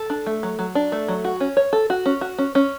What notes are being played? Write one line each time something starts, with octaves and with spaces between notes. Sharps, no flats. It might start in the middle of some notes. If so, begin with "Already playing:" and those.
Already playing: A4
D4
A3
F#3
F#3
D4
A3
F#3
F#4
C#4
C#5
A4
F#4
C#4
F#4
C#4
C#4